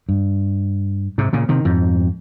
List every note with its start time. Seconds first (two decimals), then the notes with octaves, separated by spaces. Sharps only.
0.09 G2
1.18 G#2 C3
1.33 A#2 C#3
1.49 C3 D#3
1.65 F2 G#2